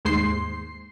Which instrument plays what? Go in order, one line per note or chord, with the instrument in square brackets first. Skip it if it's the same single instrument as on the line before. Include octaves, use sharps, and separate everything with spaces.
[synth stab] D#2 G#2 G#3 C5 C6 C7